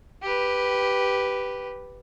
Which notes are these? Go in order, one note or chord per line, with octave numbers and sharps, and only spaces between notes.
G4 B4